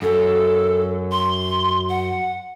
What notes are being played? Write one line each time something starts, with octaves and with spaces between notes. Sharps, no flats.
F#2 A4
C6
F#5